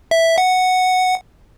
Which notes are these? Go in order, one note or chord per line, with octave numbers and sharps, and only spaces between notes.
E5
F#5